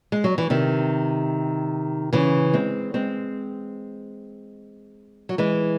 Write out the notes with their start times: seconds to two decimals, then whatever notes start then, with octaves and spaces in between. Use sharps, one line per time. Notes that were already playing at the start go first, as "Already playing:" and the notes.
0.12 G#3
0.24 F#3
0.38 E3
0.50 C3 D#3
2.13 C#3 E3
2.53 G#3 C4
2.94 G#3 C4
5.29 F#3
5.38 E3 G#3